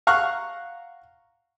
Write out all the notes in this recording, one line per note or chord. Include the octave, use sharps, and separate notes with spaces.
F5 F#5 A#5 C#6 F6 F#6